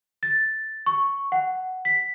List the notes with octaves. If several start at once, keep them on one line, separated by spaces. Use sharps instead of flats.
A6
C#6
F#5
B6